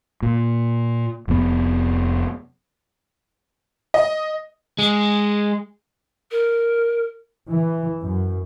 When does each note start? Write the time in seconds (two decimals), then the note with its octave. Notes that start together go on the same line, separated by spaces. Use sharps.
0.22 A#2
1.28 F1 F2 A2 B3
3.94 D#5
4.79 G#3
6.31 A#4
7.48 E3
8.01 F#2